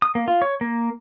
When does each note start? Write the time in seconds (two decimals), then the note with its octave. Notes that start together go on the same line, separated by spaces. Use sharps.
0.02 D#6
0.15 A#3
0.28 F4
0.42 C#5
0.61 A#3